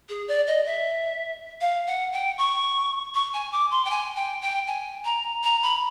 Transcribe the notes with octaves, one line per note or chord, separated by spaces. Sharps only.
G#4
D5
D#5
E5
F5
F#5
G5
C#6
C#6
G#5
D6
C6
G5
G#5
G5
G5
G#5
A#5
A#5
B5